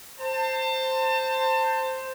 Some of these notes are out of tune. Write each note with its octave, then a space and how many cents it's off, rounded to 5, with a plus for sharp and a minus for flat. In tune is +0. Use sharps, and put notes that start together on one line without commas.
C5 +0 A5 +30